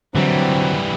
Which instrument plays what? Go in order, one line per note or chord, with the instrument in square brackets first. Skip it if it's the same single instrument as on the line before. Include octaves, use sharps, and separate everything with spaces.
[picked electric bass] D3 [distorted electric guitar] E3 G3 [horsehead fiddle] F#3 [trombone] C4